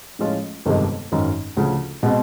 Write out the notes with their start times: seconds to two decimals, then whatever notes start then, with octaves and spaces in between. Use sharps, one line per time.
0.19 A2 F3 G#3 C#4 F4
0.66 G1 F2 C3 D#3 G#3
1.12 G#1 F#2 D#3
1.57 D2 C#3 F3
2.03 B2 G#3 C4